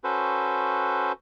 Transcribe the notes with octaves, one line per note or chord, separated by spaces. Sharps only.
C#4 F#4 A4 B4 C5